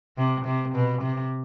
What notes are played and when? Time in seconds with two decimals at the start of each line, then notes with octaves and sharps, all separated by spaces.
0.18 C3
0.45 C3
0.75 B2
1.02 C3